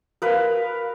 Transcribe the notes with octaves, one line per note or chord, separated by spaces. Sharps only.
A#4 B4 F5